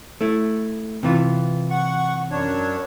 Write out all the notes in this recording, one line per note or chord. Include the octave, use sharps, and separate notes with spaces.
A3 E4
C3 E3 F4
F#5 C#6
F#2 D4 C#5